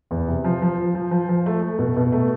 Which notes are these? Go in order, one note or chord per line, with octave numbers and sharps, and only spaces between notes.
E2
C3
F3
F3
F3
F3
F3
F3
A3
A3
B2
B2
A3